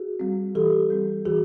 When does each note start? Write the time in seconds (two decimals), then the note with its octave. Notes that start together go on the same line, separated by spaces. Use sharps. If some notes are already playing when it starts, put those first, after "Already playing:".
Already playing: F#4 G#4
0.20 G3 C4
0.55 E3 G4 A4
0.90 G3 C4
1.25 E3 F#4 G#4